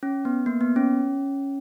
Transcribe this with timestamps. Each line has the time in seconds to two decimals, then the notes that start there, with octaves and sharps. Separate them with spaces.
0.03 C#4
0.25 B3
0.46 A#3
0.61 B3
0.76 C#4